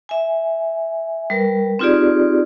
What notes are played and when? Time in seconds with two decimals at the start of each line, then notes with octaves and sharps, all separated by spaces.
0.09 E5 G#5
1.30 G3 A#4 B4
1.79 C4 D#4 F4 G4 G#4 D5